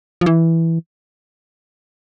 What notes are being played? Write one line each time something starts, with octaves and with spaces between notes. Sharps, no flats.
F3
E3